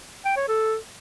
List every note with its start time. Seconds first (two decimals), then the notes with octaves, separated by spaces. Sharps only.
0.25 G5
0.37 C#5
0.48 A4